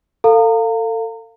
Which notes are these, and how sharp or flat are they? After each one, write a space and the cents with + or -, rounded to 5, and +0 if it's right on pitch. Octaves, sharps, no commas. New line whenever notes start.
A4 +30 F5 +0 A#5 -30